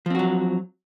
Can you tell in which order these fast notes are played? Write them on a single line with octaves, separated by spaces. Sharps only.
F3 C4 F#4 F#3